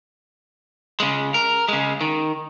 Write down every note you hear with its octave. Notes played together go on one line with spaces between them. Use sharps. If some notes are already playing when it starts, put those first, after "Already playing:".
C#3 G#3
A#4
C#3 G#3
D#3